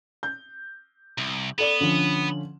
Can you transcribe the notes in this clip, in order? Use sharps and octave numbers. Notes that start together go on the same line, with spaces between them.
G6
C2
B3 A4 D5 E7
D3 F3 C#4